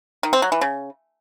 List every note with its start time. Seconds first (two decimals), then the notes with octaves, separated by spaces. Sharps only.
0.23 D#3
0.33 C4
0.42 F#3
0.52 E3
0.61 C#3